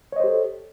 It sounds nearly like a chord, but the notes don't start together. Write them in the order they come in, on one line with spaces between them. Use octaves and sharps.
C#5 D#5 C5 G4 A4